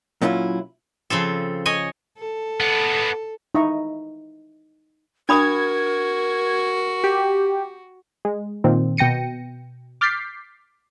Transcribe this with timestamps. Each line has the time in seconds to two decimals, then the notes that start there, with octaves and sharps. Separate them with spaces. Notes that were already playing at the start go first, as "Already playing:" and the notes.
0.21 A#2 F#3 C#4 D4 E4 F4
1.10 C#3 F3 C4 A4
1.66 C#5 D#5 G#5
2.18 A4
2.60 B3 D4
3.55 D#4 E4 D#5 E5 A#5 C#6
5.29 D4 F#4 A#4 B5 D#6 G#6
7.04 G4
8.25 G#3
8.64 A#2 D#3 C4
8.97 B2 G5 A#6 C#7 D#7
10.01 D6 F6 G6 A6 B6 C7